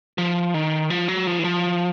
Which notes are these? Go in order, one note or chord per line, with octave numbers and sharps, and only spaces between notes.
F3
D#3
F3
F#3
F3
E3
F3